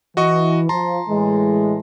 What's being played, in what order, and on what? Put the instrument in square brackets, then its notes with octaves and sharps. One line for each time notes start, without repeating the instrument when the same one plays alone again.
[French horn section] E3 [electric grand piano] F#4 D#5 C#6
[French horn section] F3 [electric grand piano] A5 A#5 C6
[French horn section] A2 E3 G#3